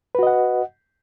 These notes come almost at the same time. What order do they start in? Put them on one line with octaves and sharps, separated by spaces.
B4 F#4 D#5 F#5